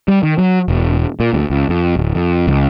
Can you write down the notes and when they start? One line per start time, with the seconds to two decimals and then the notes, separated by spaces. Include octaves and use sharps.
0.08 G3
0.23 D#3
0.38 F#3
0.68 E1
1.20 A#2
1.34 D2
1.50 C#2
1.69 F2
1.96 D1
2.15 F2
2.47 C#2